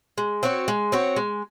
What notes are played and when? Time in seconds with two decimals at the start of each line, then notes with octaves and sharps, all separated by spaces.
0.18 G#3
0.43 C4 F#4 C#5
0.68 G#3
0.92 C4 F#4 C#5
1.16 G#3